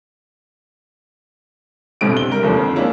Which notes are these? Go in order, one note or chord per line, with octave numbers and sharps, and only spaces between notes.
A1 G2 B2 D3 C4 D7
C3 G7
G3 A#4
F1 D#2 D3 F3
F2
G#3 A#3 C#4 D4 E4